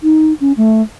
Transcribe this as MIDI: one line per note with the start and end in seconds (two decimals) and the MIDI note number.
0.03 0.33 63
0.41 0.52 61
0.57 0.82 57